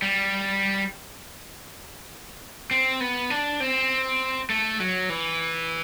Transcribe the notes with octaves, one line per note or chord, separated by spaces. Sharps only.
G3
C4
B3
D4
C4
A3
F#3
E3